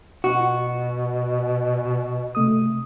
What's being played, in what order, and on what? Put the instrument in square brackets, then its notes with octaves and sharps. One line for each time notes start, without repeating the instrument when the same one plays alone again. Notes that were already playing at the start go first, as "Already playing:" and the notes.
[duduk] B2 [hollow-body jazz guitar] F#4
[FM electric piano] C3 A3 D#6